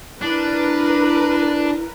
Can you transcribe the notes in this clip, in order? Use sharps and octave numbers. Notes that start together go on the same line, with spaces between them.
D4 E4 A#4 B4